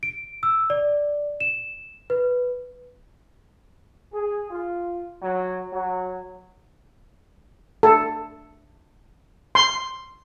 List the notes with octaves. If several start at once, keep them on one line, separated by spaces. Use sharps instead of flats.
D7
E6
D5
E7
B4
G#4
F4
F#3
F#3
A4
C6